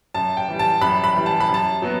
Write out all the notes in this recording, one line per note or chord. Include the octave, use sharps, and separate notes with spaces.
F#2 A5
G5
E3 G3
A5
F#2 B5
B5
E3 G3
A5
B5
F#2 A5
F#3 B3